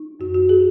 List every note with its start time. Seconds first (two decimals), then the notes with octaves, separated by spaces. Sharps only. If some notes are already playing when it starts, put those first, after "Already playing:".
Already playing: D#4
0.20 F#2 F#4
0.34 F#4
0.49 G#4